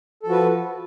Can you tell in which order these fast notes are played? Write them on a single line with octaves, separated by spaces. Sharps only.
A4 F3 F#4 B4